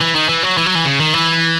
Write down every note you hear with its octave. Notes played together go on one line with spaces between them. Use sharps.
E3
D#3
E3
F#3
E3
F#3
E3
C#3
D#3
E3